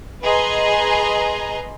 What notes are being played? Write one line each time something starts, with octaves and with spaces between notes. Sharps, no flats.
G#4 B4 D#5 A#5 C6